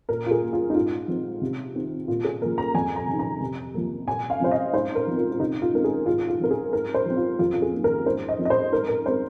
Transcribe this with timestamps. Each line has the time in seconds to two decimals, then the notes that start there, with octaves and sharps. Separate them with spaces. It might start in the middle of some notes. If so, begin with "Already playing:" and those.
0.09 A#2 A#4
0.26 F4
0.31 G#4
0.42 A#3
0.53 F4
0.70 D#4
0.75 G#2 F4
1.08 F3 C4
1.42 C3
1.75 D#3 C4
2.07 A#2 F4
2.24 G#4
2.41 F3 A#3 A#4
2.58 A#5
2.75 F2 G#5
2.96 A#5
3.07 C3
3.13 D#3
3.19 A#5
3.41 C3
3.74 F3 A#3
4.07 A#2 G#5
4.30 F5
4.40 F3 C4 C5
4.51 D#5
4.73 G#2 C5
4.95 A#4
5.07 F3 C4
5.18 F4
5.32 F4
5.40 C3 D#4
5.62 F4
5.73 D#3 G#3 C4 A#4
5.84 G#4
6.06 G#2 F4
6.29 F4
6.40 F3 C4 A#4
6.51 G#4
6.73 G#2 A#4
6.94 C5
7.06 F3 C4
7.17 F4
7.39 F2 F4
7.54 F4
7.62 G#4
7.73 D#3 A#3
7.84 A#4
8.06 G#2 C5
8.28 D#5
8.38 F3 C4
8.45 D#5
8.50 C5
8.72 G#2 A#4
8.88 A#4
9.06 G#3 C4 C5